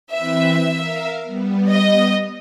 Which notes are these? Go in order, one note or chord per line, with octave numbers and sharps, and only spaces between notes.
E3 C4 B4 E5
A#4 F5
G3 B3
D#5